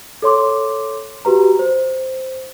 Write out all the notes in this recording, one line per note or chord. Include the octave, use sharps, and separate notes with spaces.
A4 C#5 C6 D6
F#4 G4 B4 A#5
C5